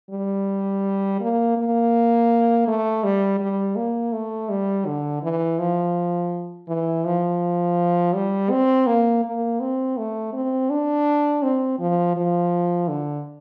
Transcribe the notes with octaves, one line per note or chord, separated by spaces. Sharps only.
G3
A#3
A#3
A3
G3
G3
A#3
A3
G3
D3
E3
F3
E3
F3
G3
C4
A#3
A#3
C4
A3
C4
D4
C4
F3
F3
D3